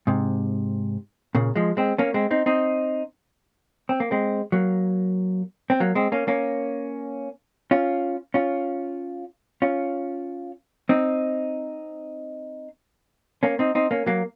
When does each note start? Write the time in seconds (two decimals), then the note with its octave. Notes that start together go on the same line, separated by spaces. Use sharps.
0.07 G#2 C3
1.35 A#2 C#3
1.56 F3 G#3
1.77 G#3 C4
1.98 A#3 C#4
2.14 G#3 C4
2.31 C4 D#4
2.46 C4 D#4
3.89 C4
4.00 A#3
4.11 G#3 C4
4.52 F#3 A#3
5.70 C4
5.80 F#3 A#3
5.95 G#3 C4
6.12 A#3 C#4
6.28 A#3 C#4
7.71 C#4 F4
8.34 C#4 F4
9.62 C#4 F4
10.89 C4 D#4
13.43 A#3 C#4
13.59 C4 D#4
13.75 C4 D#4
13.91 A#3 C#4
14.06 F#3 A#3